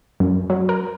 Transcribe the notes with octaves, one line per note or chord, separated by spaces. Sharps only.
F#2
F#3
A#4